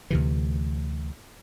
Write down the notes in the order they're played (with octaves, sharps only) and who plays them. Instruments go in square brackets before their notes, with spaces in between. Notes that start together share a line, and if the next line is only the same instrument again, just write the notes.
[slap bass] D2 C3 E3